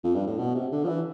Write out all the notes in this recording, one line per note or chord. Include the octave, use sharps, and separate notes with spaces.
F2
G2
A2
B2
C3
D3
F3
E3